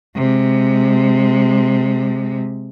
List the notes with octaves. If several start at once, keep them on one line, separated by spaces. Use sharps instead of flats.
C3 G#3